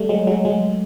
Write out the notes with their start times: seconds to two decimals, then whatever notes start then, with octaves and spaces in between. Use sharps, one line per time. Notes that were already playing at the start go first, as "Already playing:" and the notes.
Already playing: G3 A3
0.09 F#3 G#3
0.27 F#3 G#3
0.45 F#3 G#3